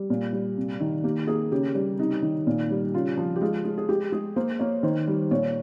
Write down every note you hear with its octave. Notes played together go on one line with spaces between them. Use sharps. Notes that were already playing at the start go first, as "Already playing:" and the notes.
Already playing: G3
A#2
G3
C3
D#3
A#3 G4
A#3 G#4
C#3 G4
G3
C3 D#4
D#3
A#2
G3
C#3 F4
F3
G4
G#3 F4
G#3
G#4
G#3 G4
G#3 G#4
A#3 C5
A#3 C#5
D#3 C5
G3
A#2 C#5